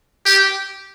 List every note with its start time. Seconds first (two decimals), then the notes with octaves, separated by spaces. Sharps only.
0.26 G4